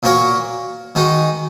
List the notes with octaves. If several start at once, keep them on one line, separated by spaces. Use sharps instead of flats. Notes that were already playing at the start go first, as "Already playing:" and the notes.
A#2 A#3 F#4 A#4 C#5
D#3 G#3 D#4 F#4